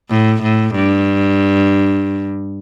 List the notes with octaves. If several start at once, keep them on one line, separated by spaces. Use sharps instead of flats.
A2
A2
G2